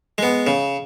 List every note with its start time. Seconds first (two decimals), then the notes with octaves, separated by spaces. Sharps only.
0.18 G#3 B3
0.47 C#3